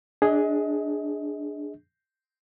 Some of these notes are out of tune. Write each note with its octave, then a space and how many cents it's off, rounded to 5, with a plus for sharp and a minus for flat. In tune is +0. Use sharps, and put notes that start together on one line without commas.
D4 +0 G#4 +0 D#5 +35